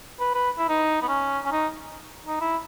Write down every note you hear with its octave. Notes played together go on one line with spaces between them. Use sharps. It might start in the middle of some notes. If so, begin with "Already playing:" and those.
B4
B4
E4
D#4
B3
C#4
C#4
D#4
D#4
E4